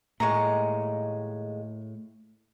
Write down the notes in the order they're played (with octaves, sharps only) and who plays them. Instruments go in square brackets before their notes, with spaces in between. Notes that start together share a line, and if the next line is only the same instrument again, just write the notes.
[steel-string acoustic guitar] D#2 G#3 [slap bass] A2 [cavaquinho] A#5 C#6